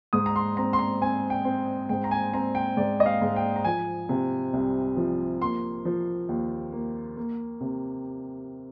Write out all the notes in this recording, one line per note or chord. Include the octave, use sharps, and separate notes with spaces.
G#2 D#6
A#5
C6
C4 A#5
C6
A#5
C4 G#5
G5
C4
G#2 G5
A#5
G#5
C4 A#5
G5
G#2 D5
D#5
F5
G#2
G5
A#5
F3 G#5
C3
C2
F3
A#3 C6
F3
D#2
A#3
A#3
C3